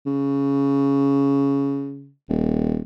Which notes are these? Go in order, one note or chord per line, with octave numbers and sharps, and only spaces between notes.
C#3
D#1